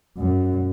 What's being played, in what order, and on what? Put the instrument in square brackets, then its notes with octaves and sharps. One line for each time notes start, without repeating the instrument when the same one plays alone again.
[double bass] F#2